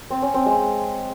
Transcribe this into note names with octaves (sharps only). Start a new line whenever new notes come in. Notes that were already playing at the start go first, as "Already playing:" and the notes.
C4
C#4
C4
G#3